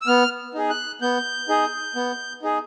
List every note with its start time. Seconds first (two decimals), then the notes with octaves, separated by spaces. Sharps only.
0.02 E6
0.07 B3 F6
0.54 D#4 G#4
0.70 F#6
1.02 B3 G6
1.49 D#4 G#4
1.96 B3
2.42 D#4 G#4